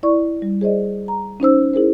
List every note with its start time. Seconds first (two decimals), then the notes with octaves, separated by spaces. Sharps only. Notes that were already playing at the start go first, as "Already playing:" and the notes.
0.03 E4 D5 C#6
0.42 G3
0.61 G#4 C5 D5 D#5
1.08 A#5
1.40 C#4 D#4 C5 E6
1.73 E4 G#4 A#4 C5